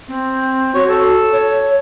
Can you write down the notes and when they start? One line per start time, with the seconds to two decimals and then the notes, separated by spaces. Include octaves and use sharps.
0.08 C4
0.75 F#4 C#5
0.89 A4
1.32 C#5